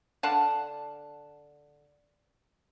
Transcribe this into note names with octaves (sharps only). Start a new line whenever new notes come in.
D3 F5 F#5 A5